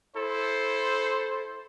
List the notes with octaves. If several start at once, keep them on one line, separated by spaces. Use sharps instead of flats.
E4 A4 C5